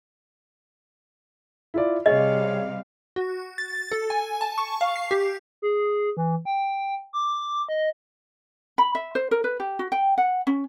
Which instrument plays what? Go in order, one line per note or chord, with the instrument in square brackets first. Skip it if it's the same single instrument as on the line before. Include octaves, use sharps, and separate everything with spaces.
[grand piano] E4 F4 D5
[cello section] C3 G3 F5 [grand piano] G#4 C#5 [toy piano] D#5
[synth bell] F#4
A6
A4
G#5
A5
C#6
F5
C7
G4
[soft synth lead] G#4
E3
G5
D6
D#5
[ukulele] B5
E5
C5
A#4
B4
G4
F#4
G5
F#5
C#4